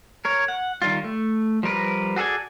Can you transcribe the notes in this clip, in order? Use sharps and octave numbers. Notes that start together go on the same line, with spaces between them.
A#4 C#5
F#5
D#3 G3 F4
A3
F3 G3 A#4 B4
F#4 G#4 A4 D5 G#5